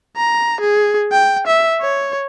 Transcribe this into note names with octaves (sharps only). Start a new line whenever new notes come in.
A#5
G#4
G5
E5
C#5